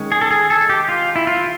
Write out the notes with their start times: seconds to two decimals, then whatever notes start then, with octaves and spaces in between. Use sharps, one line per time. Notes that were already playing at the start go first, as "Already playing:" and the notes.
Already playing: D#3 G#3 C#4
0.12 G#4
0.21 A4
0.31 G#4
0.50 A4
0.70 G4
0.89 F4
1.16 E4
1.27 F4